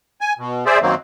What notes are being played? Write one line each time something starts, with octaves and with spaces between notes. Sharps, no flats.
G#5
B2
G#4 C5 D5 E5
F#2 D#3 F#3 A#3 C4